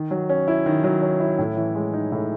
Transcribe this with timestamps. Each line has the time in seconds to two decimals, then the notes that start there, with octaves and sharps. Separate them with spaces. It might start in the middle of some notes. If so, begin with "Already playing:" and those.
Already playing: D#3
0.11 F#3
0.29 C#4
0.48 E4
0.66 D#3
0.84 F#3
1.02 C#4
1.20 E4
1.39 A2
1.57 E3
1.75 G#3
1.93 D#4
2.12 A2